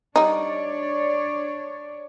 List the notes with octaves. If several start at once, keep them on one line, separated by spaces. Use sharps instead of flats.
G3 D4 D#4 C#5 D5